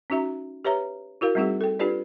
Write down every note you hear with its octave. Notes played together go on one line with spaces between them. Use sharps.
C#4 D#4 F#4 E5 A#5
G4 B4 C#5 E5 A#5
E4 F#4 A#4 F5
G3 A3 C4 D#4 F#4 G#4
A4 G5
D4 F4 G4 B4 D5